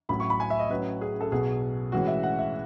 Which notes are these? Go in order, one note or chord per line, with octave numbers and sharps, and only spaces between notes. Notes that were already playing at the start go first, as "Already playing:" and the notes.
A1 A2 F#3 B5
C#6
B5
G#5
E5
D#5
A2 F#3 C#4 B4
G#4
A4
B1 B2 F#3 B3 G#4
A2 E3 G#3 C#4 F#4
E5
F#5
E5